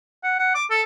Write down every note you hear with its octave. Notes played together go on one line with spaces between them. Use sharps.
F#5
F#5
D6
A4